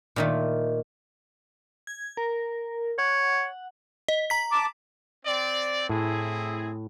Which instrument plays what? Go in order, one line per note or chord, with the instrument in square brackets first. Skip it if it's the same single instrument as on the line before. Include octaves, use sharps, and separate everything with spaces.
[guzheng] A#2 D#3 A3
[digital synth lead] G#6
A#4
[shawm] C#5 [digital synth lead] F#5
[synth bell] D#5
A#5 B6
[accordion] A5 D6
[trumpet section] C4 D5
[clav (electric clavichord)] A2 [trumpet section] C4 E4 G#4